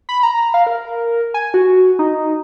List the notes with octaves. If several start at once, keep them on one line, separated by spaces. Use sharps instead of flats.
B5
A#5
F5
A#4
G#5
F#4
D#4